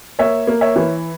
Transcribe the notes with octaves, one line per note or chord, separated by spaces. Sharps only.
A#3 C#5 E5
A#3
C#5 E5
E3